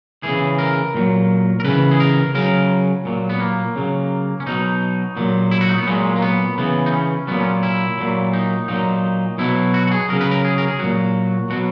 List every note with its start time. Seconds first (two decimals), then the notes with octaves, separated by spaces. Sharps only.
0.23 C#3 E3 G#4
0.59 A#4
0.94 A#2 F#3
1.60 A#4
1.64 C#3 E3 B4
1.91 G#4
2.00 A#4
2.34 C#3 F#3 A#4
3.05 A#2 F#3
3.29 B3
3.40 A#3
3.76 C#3 F#3
4.40 C#4
4.46 B2 F#3 D#4
5.17 A#2 F#3
5.51 E4
5.61 F#4
5.69 D#4
5.78 B3
5.87 A#2 F#3 G#3
6.16 A#3
6.22 B3
6.58 C#3 E3 B3
6.86 D#4
6.92 C#4
7.27 A#2 F#3 B3
7.39 C#4
7.63 E4
7.98 A#2 F#3
8.33 D#4
8.68 A#2 F#3 D#4
9.38 B2 F#3 E4
9.74 F#4
9.87 F#4
9.91 G#4
10.09 C#3 F#3 A#4
10.21 B4
10.31 A#4
10.45 G#4
10.58 A#4
10.68 G#4
10.79 A#2 F#3 F#4
11.50 B2 F#3 F#4